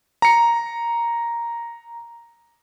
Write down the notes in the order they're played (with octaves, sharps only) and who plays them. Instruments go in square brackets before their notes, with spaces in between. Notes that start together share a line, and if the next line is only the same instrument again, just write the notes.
[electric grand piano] A#5 C#7